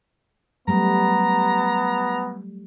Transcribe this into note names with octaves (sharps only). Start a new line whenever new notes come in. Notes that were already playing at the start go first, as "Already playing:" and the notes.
F#3 G3 A3 B3 A#5